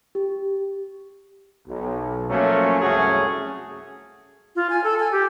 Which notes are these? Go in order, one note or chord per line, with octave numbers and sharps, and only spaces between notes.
G4
B1
F3 F#3 A3 A#3 C#4
C2 F#2 A3 C#4 F#4 G#4
F4
G#5
A4
G#5
G4